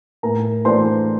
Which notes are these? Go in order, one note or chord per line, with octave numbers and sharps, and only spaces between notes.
A2 A#4 A#5
E3 A3 D4 C5 C6